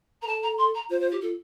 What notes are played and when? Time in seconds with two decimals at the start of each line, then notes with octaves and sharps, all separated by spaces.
0.22 A#4 A#5
0.27 A4 A5
0.43 A#5
0.58 C6
0.74 A#5
0.90 F4 C5
1.00 C5
1.11 G4
1.21 F4 A4